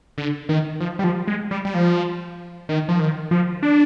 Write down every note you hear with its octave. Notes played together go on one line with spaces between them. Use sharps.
D3
D#3
F3
G3
F3
G#3
G3
G3
F3
D#3
F3
D#3
F3
D4